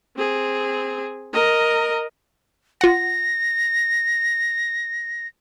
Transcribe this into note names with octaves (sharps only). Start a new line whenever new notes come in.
C4 G#4
A#4 D#5
F4 F#5 A#6